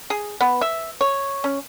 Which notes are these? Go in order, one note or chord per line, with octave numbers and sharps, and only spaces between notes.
G#4
B3
E5
C#5
C#4